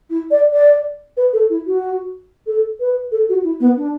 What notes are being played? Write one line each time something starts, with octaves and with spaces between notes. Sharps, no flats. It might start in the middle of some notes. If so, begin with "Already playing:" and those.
E4
D5
D5
B4
A4
E4
F#4
A4
B4
A4
F#4
E4
B3
D4